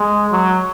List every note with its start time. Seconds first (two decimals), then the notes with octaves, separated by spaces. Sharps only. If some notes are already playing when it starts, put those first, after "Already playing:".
Already playing: G#3
0.31 F#3